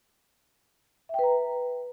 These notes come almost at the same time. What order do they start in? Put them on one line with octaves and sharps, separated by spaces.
E5 G5 B4 A#5